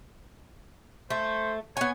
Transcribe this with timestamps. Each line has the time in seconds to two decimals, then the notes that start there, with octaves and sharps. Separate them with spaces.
1.10 A3 C5
1.77 B3 C#5 G#5